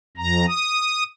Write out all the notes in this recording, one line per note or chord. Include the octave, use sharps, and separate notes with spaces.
F2 A#5
D#6